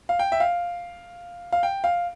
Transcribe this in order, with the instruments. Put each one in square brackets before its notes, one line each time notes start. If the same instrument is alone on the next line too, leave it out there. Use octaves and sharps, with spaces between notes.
[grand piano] F5
G5
E5
F5
F5
G5
F5